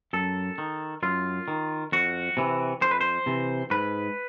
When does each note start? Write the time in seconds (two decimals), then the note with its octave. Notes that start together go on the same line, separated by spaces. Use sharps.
0.13 F#2 A4
0.58 D#3
1.03 F#2 F4
1.48 D#3
1.92 F2 F#4
2.37 C3 E3
2.82 F2 C5
2.91 B4
3.01 C5
3.26 C3 E3
3.71 G#2 B4